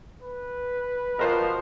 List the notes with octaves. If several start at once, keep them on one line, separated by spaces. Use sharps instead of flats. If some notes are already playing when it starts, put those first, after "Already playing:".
B4
B2 F3 A#4 C5